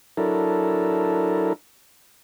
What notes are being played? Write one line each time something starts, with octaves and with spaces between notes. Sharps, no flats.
F#3 D4 E4 A4 A#4